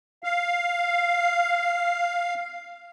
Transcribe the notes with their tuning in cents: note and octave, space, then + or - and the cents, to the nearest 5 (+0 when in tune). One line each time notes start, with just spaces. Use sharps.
F5 +0